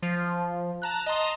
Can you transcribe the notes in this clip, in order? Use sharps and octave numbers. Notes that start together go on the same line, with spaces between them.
F3
A5 A#5 F#6
D#5 A5 A#5 C6 D#6